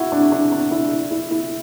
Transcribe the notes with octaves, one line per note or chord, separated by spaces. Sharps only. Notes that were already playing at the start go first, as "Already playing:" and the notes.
Already playing: E4 F#4
D4
D4
D4
E4
E4
E4